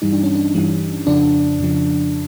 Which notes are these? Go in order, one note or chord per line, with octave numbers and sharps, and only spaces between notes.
G2 E3 G3 D#4
D4
C#4
D4
G2 E3 G3
F2 C#3 F3 D4
F2 C#3 F3